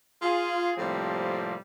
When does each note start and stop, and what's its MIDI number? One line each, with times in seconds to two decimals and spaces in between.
0.22 0.73 65
0.22 0.73 68
0.77 1.54 45
0.77 1.54 48
0.77 1.54 53
0.77 1.54 55
0.77 1.54 58
0.77 1.54 60